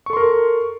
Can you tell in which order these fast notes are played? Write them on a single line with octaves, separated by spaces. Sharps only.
C#6 A4 C6 A#4